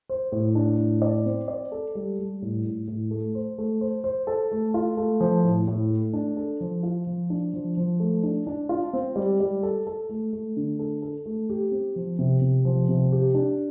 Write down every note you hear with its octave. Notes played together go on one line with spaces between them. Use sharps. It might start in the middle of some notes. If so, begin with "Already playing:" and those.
C5
A2
D4
A2
D5
C4
D5
A4
G3
G3
A2
A2
A2
A3
C5
A3
C5
C5
A4
A3
F4
A3
F3
A2
A2
A3
D4
A4
F3
F4
F3
D4
F3
F3
A3
D4
D4
F4
C4
G3
G3
A4
A4
A3
A3
D3
A4
A4
A3
G4
C4
F3
C3
C3
F3
C3
G4
D4